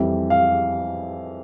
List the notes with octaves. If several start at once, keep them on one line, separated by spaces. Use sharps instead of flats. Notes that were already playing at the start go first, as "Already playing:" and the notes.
Already playing: F2 E3 G3
F5